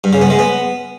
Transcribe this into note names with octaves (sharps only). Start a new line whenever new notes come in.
G2
C#3
B3
G#3
B3